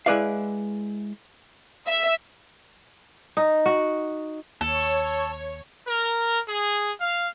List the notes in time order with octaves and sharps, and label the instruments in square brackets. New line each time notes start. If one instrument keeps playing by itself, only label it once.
[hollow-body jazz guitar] G#3 E4 B4 D5 E5 F5
[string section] E5
[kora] D#4
F#4
[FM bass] D#2 [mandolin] A4 [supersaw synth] C#5
[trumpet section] A#4
G#4
F5